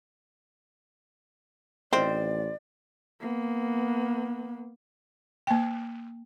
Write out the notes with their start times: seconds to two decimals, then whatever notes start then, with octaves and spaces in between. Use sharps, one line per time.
1.93 A1 D#3 F3 C4 C5 D5
3.21 A#3 B3
5.47 A#3 G5